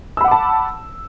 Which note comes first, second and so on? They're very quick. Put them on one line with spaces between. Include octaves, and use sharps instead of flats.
E6 B5 F#5 D6 A5